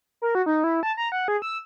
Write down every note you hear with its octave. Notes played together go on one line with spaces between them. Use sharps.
A#4
F#4
D#4
E4
A5
A#5
F#5
G#4
E6